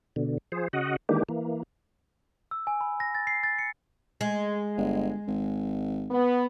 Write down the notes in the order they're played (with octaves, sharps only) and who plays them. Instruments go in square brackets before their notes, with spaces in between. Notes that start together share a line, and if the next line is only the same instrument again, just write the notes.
[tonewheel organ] B2 D3
F3 G#4 C5
C#3 F#4 D#5 F#5
D#3 E3 G#3 A#3 D4 G4
E3 A#3
[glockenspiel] E6
G#5
B5
A#6
A6
C7
A6
C#7
[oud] G#3
[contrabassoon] G1
G#1
[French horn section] B3